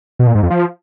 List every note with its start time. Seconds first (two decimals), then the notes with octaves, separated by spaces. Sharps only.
0.19 B2
0.27 A#2
0.35 G#2
0.43 F2
0.50 F3